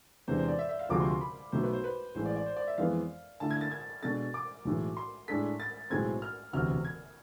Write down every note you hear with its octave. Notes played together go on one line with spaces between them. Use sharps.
E2 C3 G#3 D4 C5
C5
D5
E5
E5
F5
D2 C3 F3 G#3 C4 D6
C6
C6
B5
B1 B2 A3 C5
B4
C5
B4
A1 A2 G#3 C5
D5
D5
C5
D5
E5
F2 E3 G#3 B3 F5
D3 A3 E4 A5
G#6
A6
G#6
B2 G#3 B3 D4 A4 A6
D6
B1 A2 E3 G#3
C6
A2 G#3 D4 A4 B6
A6
B1 A2 G#3 C4 G#6
F6
E1 D2 C3 F6
G#6